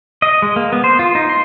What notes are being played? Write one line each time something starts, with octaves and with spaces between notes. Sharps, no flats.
D#5
G#3
A#3
B3
C5
F4
D#4
C6